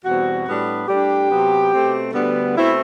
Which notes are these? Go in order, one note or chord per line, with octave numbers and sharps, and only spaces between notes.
E2 B2 G3 C4 F#4
A2 G3 B3 D4
A2 G3 D4 G4
C3 F#3 B3
B2 A3 C4
D2 D3 G3 B3
B2 A3 C4 E4